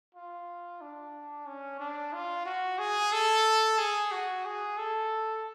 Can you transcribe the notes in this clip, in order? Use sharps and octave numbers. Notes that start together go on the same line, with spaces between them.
F4
D4
C#4
D4
F4
F#4
G#4
A4
G#4
F#4
G#4
A4